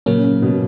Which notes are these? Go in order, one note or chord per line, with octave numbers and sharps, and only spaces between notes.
A#2 C#3 F#3 A#3 C#4
C#3
B2